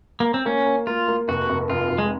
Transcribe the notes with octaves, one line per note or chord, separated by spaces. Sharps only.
A#3
C4
A#3 C#4
A#3
A#3 F4
A#3
F1 F#4
F1
F1 F4
F1
G#3